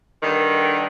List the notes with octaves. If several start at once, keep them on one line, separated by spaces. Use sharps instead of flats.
G2 D3 D#3